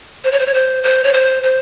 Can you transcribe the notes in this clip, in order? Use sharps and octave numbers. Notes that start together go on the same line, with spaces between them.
C5
C#5
C5
C#5
C5
C5
C#5
C5
C5